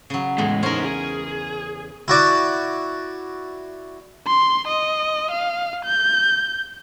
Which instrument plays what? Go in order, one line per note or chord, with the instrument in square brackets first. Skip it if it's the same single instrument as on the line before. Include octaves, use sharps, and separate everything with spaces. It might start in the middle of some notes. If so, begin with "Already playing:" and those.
[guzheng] C#3 F#3
[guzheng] E2 A2 [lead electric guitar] G#3
[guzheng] C#4 A#4 [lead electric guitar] D#4 C5
[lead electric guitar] G#4
[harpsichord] E4 F#4 D5
[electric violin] C6
D#5
F5
G6